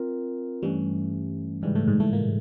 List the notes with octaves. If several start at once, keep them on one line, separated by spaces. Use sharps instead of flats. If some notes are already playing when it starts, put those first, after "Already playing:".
Already playing: C4 F4 A#4
G2 E3 G3 A3 C#4
G#2 C#3 E3 G3 G#3
A2 A3
G#2 G#3
A2 A3
A#2 A#3